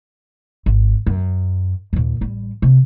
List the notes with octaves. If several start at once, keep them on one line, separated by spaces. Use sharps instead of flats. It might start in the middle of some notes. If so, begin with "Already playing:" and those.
G#1
F#2
D#2 A#2
A1 G3
C3